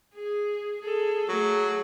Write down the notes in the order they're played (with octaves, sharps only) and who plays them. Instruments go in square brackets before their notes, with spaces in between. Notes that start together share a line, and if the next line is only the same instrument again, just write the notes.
[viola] G#4
G#4 A4
[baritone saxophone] F#3 [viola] A3 G#4